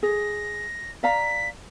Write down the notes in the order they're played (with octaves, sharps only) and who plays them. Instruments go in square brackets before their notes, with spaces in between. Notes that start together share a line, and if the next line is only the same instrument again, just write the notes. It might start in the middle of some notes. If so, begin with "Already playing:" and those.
[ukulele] G#4 [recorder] A#6
[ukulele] D5 F5 A#5 [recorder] B6